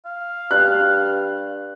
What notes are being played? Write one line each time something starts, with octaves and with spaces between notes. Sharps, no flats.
F5
G2 F#6